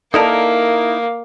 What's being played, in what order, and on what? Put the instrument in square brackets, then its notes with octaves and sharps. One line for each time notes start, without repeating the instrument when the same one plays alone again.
[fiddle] A#3 [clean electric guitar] D#4 E4 A#4 [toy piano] A4 D5 A5